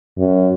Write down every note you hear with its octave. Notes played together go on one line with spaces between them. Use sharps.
F#2